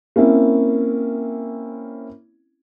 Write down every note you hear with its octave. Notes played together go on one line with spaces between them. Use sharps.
A#3 C4 C#4 E4